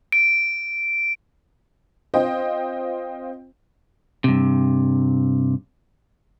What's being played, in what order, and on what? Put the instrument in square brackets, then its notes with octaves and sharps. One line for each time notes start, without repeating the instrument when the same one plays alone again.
[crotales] D7
[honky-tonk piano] C4 F4 C5 D#5 G5
[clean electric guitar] G2 C3